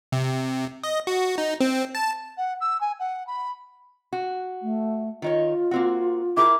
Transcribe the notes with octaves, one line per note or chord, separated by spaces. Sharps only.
C3
D#5
F#4
D#4
C4
A5
F#5
E6
G#5
F#5
B5
F#4
A3
D#3 D#4 F4 C#5
A#3 C4 F#4
E4 G#4 A#4 D6